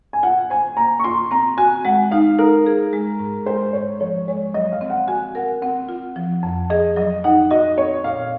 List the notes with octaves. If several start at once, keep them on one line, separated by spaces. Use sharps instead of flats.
G#5
F4 F#5
C5 G#5
A#3 A#5
C#6
F4 C6
C4 A#5
F#4 G#5
G#3 F#5
D#4 F5
D#4 A#4
G#4
G#3
G#2
G#3 C5
G#2 C#5
F3 C#5
G#3 C#5
F#3 D#5
F5
C4
F#5
F#4 G#5
A#4 F#5
C4 F#5
F4
F3
F2
G#4 D#5
F#3 D#5
D#4 F#5
F#4 D#5
C4 C#5
A#2 F5